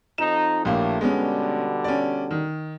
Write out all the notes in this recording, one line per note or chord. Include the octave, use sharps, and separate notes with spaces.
F2 D#4 E7
A#1 A2 A3 A#3 G4
B2 D3 G3 G#3 B3 C#4
C#4 D5
D#3